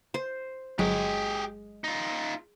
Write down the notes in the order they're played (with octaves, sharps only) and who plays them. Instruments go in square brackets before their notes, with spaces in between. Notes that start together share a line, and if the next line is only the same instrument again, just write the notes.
[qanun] C5
[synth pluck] G1 F#3 [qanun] G#3 [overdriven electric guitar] G4 G#4
[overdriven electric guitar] D#4 F4